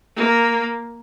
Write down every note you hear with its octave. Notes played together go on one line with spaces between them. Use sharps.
A#3